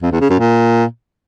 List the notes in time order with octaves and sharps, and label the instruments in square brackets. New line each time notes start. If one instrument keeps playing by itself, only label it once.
[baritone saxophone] F2
E2
C#3
F#2
A#2